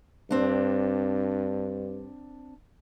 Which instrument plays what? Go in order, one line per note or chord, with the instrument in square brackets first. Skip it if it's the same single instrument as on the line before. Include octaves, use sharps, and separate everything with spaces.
[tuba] G2 [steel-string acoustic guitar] C4 D4